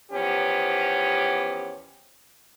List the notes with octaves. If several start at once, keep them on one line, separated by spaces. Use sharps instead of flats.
E2 F3 B3 C#4 G4